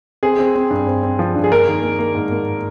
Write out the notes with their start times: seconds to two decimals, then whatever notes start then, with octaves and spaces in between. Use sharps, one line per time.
0.23 C4 G#4
0.39 C4
0.56 C4
0.71 G2
0.87 C4
1.03 C4
1.19 F3
1.36 G2
1.44 G#4
1.52 A#3 A#4
1.67 D#3
1.83 A#3
1.99 A#3
2.15 G#2
2.31 A#3